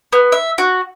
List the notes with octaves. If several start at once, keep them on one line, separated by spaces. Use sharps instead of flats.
B3
E5
F#4